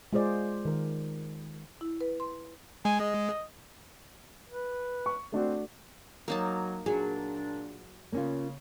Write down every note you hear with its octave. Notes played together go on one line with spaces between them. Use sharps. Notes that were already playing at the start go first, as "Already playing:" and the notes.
G#3 F4 G#4 C5 D5
D#3 A#4
E4
B4
C6
G#3 G#5
D#5
B4
C#6
A3 C4 D4 F#4
F#3 A#3 D#4 A5
A#2 F#3 D4 G#4
C#3 A#3 C#4 F4